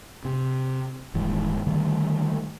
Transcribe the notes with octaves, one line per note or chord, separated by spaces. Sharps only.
C3
D#1 D#2 G#2 E3
D3 D#3 G3 A3